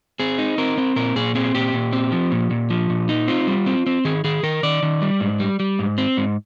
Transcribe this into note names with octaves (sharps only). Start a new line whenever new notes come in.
C4 G#4
D#4
C4 A#4
C4
A#2 A#4
A#2 G#4
C4 G#4
A#2 G4
A#2
C4
F3
A#2
A#2
F3
A#2
D#4
C4 F4
G3
C4
C4
D#3 G#4
D#3 G#4
D#3 A#4
D#3 D5
D#3
G3
G#2
G3
G3
G#2
C4
G#2